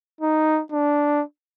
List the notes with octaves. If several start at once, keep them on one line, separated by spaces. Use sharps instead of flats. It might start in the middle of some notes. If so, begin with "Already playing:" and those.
D#4
D4